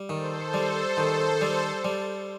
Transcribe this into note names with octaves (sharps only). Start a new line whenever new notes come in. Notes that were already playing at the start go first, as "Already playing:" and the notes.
Already playing: G3
D#3 A4 C5
G3
D#3
G3
G3